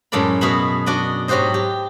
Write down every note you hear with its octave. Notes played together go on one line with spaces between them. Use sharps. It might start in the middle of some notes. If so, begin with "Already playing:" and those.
F#2 A2 G#3 A4 D5 B5
B2 F#4 G#4 E5 B5
D4 F#4 D5 D#5
G#2 F#3 F#4 G4 C5 D#5
G4